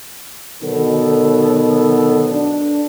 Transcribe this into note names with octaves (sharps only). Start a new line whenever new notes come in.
B2 D3 D#3 F#3 B3 A4
D4